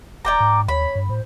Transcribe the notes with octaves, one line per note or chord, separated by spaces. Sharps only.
D#1 D5 G5 A#5 D6
G#2
D#2 C#5 B5
G2
A2 C5